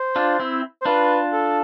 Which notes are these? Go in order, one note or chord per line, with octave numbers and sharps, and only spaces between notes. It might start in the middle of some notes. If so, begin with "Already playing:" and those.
Already playing: C5
D4 F4
C4 E4
C5
D4 F4 B4
A4